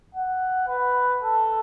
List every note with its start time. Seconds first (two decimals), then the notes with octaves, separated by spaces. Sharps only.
0.15 F#5
0.68 B4
1.22 A4